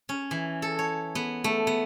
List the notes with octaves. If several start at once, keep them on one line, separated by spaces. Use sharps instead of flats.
C#4
E3
A4
C#5
B3
A3
B3